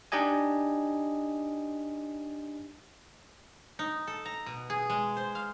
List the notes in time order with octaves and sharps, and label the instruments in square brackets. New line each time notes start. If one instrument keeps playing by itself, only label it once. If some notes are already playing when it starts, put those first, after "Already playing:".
[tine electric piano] D4 D#4 G4 D#5 G#5
[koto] D#4
A4
A#5
B2
G#4
G#3
C5
F5